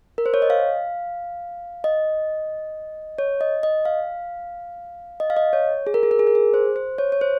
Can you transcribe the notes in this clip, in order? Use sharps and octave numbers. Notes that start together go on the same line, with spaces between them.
A#4
C5
C#5
D#5
F5
D#5
C#5
D#5
D#5
F5
D#5
F5
D#5
C#5
G#4
A#4
G#4
A#4
G#4
A#4
G#4
C5
C5
C#5
C#5
C5